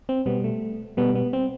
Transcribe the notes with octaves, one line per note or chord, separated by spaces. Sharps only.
C4
B2 G3 B3
A3
B2 G3 B3
B3
C4